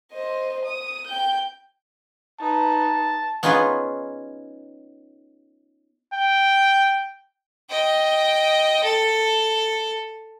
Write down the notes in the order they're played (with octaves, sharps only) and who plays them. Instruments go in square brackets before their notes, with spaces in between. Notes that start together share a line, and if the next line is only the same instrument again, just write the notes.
[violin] C5 D#5
D#6
G5 G6
[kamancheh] D#4 B4 [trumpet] A5
[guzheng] B3 C#4 D#4 F4 G#4 B4
[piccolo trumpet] G5
[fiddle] D#5 G5
A4